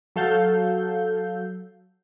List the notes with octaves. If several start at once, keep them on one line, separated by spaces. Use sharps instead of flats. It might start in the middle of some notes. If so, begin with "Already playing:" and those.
F#3 A4 F5 G6